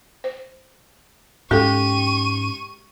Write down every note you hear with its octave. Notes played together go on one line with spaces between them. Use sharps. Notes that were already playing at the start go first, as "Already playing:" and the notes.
C5
G#2 G#3 C#4 G4 A4 C#6 D#7